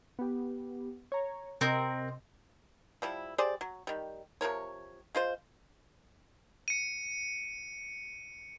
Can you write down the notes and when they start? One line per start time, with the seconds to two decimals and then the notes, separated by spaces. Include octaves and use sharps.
0.19 B3 G4
1.12 C#5 A#5
1.61 C3 C4 A#4 D#5
3.02 F3 G3 E4
3.38 G4 G#4 C5 D5
3.61 F#3
3.87 D#3 G3
4.41 C3 F3 A#4 C#5
5.15 G#3 F4 C5
6.68 C#7 D#7